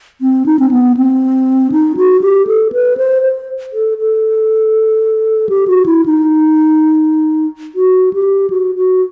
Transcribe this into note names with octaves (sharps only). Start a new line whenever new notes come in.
C4
D#4
C4
B3
C4
D#4
F#4
G4
A4
B4
C5
C5
A4
A4
G4
F#4
E4
D#4
F#4
G4
F#4
F#4